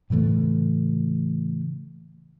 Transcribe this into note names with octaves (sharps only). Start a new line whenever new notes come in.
A2 C#3 E3 A3